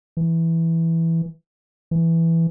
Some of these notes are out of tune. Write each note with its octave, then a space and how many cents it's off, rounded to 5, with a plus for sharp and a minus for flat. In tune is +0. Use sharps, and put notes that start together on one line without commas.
E3 +0
E3 +5